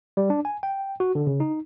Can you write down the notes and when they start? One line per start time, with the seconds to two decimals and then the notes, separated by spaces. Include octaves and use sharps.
0.17 G3
0.30 D4
0.45 G#5
0.63 G5
1.00 F#4
1.15 D3
1.27 C#3
1.40 D#4